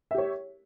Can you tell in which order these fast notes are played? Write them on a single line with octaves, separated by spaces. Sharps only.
E5 G4 C#5